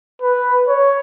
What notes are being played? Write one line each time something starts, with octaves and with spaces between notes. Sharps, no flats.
B4
C#5